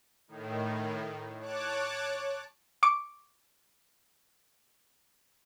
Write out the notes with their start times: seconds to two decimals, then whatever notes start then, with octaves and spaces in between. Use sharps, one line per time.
0.28 A2 D#3
1.40 C#5 A5 D6 F#6
2.83 C#6 D6